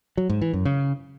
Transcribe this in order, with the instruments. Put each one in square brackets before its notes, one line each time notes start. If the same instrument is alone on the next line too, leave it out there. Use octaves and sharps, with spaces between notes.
[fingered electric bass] F#3
G#2
E3
F#2
C#3